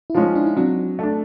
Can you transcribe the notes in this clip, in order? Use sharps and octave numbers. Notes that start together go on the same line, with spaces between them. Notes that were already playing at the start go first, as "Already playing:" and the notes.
E4
F3 G#3 C#4 D#4 F4
D4 E4
D#4
F#3 C4 D4
A3 D4